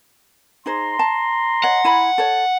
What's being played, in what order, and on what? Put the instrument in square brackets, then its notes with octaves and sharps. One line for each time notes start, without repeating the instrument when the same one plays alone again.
[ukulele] D#4 G#4 C5 [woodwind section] A#5 C6
[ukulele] A5
[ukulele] C#5 D#5 [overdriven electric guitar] F#5
[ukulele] E4 G#5 B5
A4 C#5